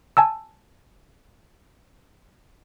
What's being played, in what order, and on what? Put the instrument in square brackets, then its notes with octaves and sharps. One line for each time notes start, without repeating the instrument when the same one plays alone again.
[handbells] G#5 A5 E6